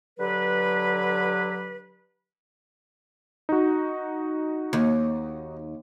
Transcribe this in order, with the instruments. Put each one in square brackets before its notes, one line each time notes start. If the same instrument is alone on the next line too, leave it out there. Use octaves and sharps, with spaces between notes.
[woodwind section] D3 F#3 G4 B4
[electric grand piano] D#4 F#4
[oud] D#2